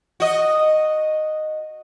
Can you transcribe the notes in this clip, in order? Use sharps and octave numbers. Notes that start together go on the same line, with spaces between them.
F#4 D#5